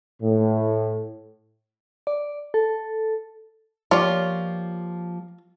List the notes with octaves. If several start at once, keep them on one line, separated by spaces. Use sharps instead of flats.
A2
D5
A4
F3 A#3 F4 G4 C#5 D5